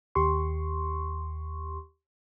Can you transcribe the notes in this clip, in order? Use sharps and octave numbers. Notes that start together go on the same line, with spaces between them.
D#2 G4 C6 C#6